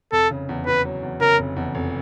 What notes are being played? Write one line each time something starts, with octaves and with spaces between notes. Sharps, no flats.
F1 A4
C#3
E2
E2 B4
F#3
E2
C#3 A#4
F1
E2
F1